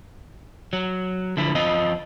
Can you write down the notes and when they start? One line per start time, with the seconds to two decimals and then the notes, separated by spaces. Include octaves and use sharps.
0.73 F#3
1.37 D3 F3 E4
1.55 F2 C4 F4 D#5